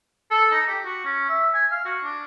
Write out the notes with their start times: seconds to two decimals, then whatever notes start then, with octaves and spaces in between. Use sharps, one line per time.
0.31 A4
0.52 D#4
0.68 G4
0.85 F#4
1.05 C#4
1.29 E5
1.54 G#5
1.72 F5
1.85 F#4
2.04 D4